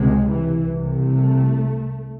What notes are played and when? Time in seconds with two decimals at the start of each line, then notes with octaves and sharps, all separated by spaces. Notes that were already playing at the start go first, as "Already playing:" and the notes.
Already playing: C#2 C3 G#3
0.27 E3
0.63 C2 C3
0.97 A3